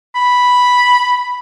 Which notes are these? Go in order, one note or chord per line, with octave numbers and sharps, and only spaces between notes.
B5